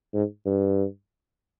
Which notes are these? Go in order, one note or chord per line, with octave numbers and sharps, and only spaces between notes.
G#2
G2